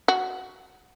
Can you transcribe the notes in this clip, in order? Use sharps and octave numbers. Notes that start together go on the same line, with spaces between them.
F#4